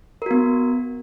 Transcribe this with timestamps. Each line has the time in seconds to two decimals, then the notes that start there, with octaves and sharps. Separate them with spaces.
0.22 A#4
0.26 F#4
0.31 B3